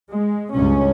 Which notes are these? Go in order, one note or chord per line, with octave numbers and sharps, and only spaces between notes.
G#3
C#2 G2 C#4